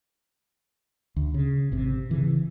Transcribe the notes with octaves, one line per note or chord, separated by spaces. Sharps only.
D2
C#3
G#1 C3
C#3 E3